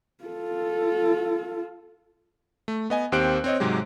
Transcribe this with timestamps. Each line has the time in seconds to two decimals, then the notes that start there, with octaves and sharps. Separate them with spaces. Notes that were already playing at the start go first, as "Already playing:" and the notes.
0.24 F4 A4
2.68 A3
2.90 B3 D#5 G#5
3.12 D#2 C4 G4 C5 F#6 D7
3.44 C4 C#5 D#5
3.60 G#2 C3 F#3 G#3 G4